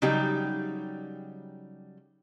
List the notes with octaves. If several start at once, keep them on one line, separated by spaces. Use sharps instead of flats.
C#3 F#3 G3 D#4 G4